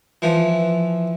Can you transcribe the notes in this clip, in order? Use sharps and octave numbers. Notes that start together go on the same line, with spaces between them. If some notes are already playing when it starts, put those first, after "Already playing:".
E3 F3